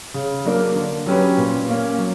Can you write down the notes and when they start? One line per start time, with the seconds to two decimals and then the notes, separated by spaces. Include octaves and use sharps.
0.14 C#3
0.45 F#3 A#3 D4 A#4
0.75 D3
1.06 F#3 C#4 G4 B4
1.37 A#2
1.68 A#3 C#4
1.98 F#3